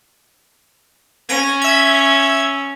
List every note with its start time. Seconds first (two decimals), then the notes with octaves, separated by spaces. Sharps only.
1.29 C#4 G#6 A#6
1.62 E5 G#6